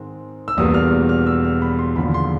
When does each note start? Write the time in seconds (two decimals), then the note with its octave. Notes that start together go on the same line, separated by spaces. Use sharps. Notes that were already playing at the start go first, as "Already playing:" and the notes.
Already playing: G#2 D#3 G#3 C4
0.48 E6
0.57 E1 E2 B2 G3 A#3 D#6
0.74 F6
1.09 F6
1.26 E6
1.44 F6
1.62 B5
1.79 C6
1.96 E1 D#2 D3 F3 B5
2.14 C6